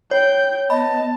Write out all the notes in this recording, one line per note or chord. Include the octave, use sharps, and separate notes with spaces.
C#5 G5 G6
B3 D#5 A5 B5